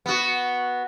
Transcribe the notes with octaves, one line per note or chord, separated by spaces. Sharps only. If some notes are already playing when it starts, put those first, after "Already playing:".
B3 F#4